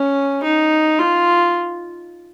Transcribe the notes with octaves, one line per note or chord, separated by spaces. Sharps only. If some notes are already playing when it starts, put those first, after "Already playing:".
Already playing: C#4
D#4
F4